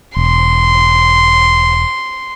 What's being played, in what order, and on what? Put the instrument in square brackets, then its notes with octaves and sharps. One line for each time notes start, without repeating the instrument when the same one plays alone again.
[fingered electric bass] E1 [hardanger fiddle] C6